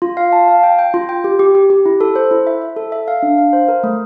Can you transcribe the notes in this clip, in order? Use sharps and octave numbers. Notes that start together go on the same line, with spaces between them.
F4
F5
A5
F5
G5
G5
F4
G5
G4
G4
G4
G4
E4
A4
C5
E4
E5
E5
A4
E5
F5
D4
F5
C5
A#4
A3